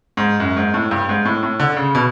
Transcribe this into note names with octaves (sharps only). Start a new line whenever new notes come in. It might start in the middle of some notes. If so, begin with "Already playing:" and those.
G#2
F#2
G#2
A2
G2
G#2
A2
A2
D3
C#3
B2